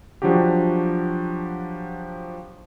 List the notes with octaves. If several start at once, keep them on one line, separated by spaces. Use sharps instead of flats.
F3 F#3 D4 F#4 G4